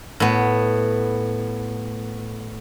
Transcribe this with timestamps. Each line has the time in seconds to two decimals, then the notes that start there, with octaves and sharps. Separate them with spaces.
0.20 A2 B3